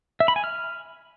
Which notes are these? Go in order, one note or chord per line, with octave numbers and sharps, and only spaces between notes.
E5
B5
G#5
F6